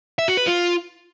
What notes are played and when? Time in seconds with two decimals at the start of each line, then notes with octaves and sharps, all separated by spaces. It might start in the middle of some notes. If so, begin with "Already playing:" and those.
0.19 E5
0.28 F#4
0.37 B4
0.47 F4